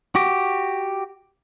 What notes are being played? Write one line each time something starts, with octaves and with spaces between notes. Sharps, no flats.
F#4 G4